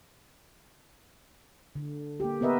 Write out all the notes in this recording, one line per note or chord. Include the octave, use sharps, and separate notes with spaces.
D3
A#3 G4
B3 A#4 B4 D#5 E5